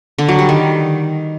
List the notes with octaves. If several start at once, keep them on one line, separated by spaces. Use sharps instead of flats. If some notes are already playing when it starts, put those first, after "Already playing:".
D3
F#3
G3
D#3